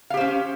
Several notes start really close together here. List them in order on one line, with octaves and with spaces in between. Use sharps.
F5 G4 C5 C#4